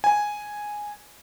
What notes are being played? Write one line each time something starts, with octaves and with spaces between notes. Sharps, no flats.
G#5